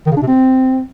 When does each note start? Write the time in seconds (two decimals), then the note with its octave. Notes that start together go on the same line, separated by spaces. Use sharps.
0.06 D#3
0.12 C#3
0.17 D4
0.22 C3
0.28 C4